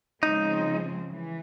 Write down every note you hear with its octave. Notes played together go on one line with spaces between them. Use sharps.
C#3 F3 G#3 C4 D#4
E3